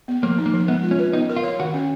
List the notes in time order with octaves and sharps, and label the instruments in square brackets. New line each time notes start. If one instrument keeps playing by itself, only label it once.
[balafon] B3
[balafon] F3 [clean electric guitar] A#3
[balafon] D#4
[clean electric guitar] A#3
[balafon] F3
[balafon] G#3 [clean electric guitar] B3
[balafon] F4
[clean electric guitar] C#4
[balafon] B4
[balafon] B3 [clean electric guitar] D#4
[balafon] A#4
[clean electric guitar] F4
[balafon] C#5
[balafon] D#3 [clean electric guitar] F#4
[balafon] C#4